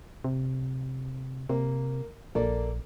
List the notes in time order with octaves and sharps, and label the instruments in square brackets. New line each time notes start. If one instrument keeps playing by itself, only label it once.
[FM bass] C3
[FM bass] C3 [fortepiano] A#3
[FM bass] A#1 [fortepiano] A#3 A4 D5